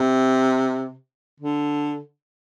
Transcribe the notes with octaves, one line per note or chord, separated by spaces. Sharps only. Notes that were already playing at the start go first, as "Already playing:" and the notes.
Already playing: C3
D3